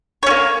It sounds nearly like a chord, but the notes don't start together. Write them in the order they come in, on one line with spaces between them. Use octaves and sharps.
C#5 C#4 A#3